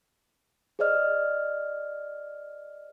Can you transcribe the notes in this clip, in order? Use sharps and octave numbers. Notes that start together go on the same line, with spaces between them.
G#4 C5 D5 D#5 F6